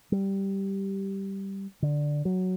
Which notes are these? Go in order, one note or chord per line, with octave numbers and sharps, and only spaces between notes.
G3
D3
F#3